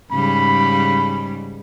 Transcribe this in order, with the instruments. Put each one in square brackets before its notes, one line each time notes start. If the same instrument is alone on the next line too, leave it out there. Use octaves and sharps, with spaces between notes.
[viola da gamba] G#2 C#3 G3 [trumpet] B5